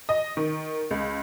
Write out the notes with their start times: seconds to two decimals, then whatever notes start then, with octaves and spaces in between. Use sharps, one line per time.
0.09 D#5
0.37 D#3
0.91 C#2